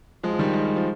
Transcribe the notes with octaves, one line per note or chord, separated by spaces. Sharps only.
F3 G#3
F3
D#3 G3
G#3
G3
F3